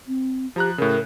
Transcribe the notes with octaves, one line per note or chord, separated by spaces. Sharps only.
C4
F3 G4 A#5 F#6
A2 C#3 A#4